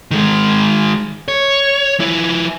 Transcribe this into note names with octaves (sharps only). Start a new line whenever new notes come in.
D#3 G#3
C#5
F3 E4